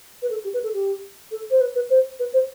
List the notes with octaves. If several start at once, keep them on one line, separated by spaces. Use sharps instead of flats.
B4
A4
G4
B4
A4
G4
A4
C5
B4
B4
C5
B4
C5